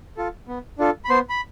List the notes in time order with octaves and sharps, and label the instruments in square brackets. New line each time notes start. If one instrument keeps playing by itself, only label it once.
[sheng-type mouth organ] F4 A4
B3
D4 F4 A4
B5
B3 C5 C6
B5